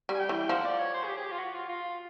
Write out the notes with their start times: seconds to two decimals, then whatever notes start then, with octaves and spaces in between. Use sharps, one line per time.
0.09 G3
0.14 G#5
0.19 G5
0.29 E3
0.49 F3 F#5
0.64 D5
0.79 C#5
0.94 C5
1.03 G#4
1.08 G4
1.17 G#4
1.23 G4
1.32 F4
1.39 F#4
1.54 F4
1.69 F4